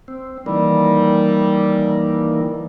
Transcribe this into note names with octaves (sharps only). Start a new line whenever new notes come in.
C4
D#3 E3 G3 A#3